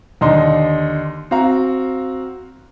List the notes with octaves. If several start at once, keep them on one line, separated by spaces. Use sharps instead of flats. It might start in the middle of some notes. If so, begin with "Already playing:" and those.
D#2 D3 D4 D#4 A#5 C6
C4 F#4 F5 A#5